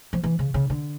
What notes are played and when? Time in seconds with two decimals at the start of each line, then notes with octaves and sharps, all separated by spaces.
0.13 F3
0.24 E3
0.39 C#3
0.54 C#3
0.70 D3